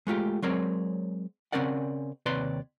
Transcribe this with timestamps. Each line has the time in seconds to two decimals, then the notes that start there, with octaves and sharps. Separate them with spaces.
0.07 G#3 A3 F4 G4
0.42 F#3 G#3 C4 A#4 C#5 D5
1.52 C#3 C4 C#4 A#4 D5 F#5
2.26 D#2 C3 B4 C#5 D5 C6